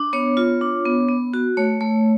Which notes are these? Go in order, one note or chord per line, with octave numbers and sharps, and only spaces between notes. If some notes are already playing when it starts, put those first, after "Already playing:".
Already playing: D4
B3 C#5
F4
D4
B3
B3
F#4
A3 C#5
A3